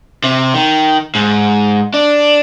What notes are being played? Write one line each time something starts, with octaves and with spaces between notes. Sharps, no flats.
C3
D#3
G#2
D4